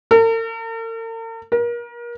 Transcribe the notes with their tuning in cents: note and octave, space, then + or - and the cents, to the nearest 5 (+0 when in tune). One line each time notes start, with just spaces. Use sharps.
A#4 -45
A#4 +35